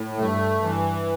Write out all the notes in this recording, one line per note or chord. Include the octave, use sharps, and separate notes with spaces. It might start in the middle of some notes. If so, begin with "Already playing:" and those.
Already playing: A2
G2 A3
G2 E3